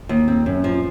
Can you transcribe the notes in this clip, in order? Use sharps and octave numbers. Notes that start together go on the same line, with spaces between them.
D#2
C4
F#2
F3